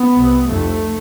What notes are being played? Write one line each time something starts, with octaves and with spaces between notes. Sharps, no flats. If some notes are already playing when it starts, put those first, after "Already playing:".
Already playing: B3
C2 C3
F1 F2 C3 A3